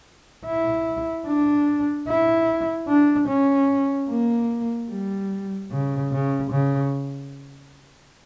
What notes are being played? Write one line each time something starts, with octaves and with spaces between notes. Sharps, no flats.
E4
D4
E4
D4
C#4
A#3
G3
C#3
C#3
C#3